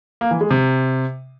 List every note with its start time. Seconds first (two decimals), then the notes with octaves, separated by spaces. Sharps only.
0.21 A#3
0.31 E3
0.41 G#3
0.51 C3